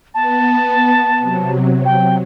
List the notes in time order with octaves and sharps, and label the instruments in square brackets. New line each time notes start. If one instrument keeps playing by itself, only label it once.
[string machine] B3 [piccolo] A5
[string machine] C3 F#3
[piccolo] G5